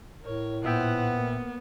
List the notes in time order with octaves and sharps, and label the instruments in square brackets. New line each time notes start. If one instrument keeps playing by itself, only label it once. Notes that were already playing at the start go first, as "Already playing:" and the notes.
[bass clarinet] A2 [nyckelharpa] A#4 C#5
[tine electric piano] A#2 E5 G5 [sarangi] B3 [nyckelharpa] C5 F#5
[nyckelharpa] A#3